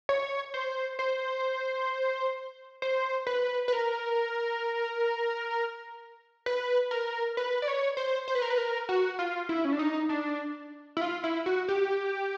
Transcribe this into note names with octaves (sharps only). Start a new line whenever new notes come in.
C#5
C5
C5
C5
B4
B4
A#4
B4
A#4
B4
D5
C#5
C5
C5
B4
A#4
B4
A#4
F#4
F4
E4
C#4
D4
D#4
D4
E4
F4
E4
F#4
G4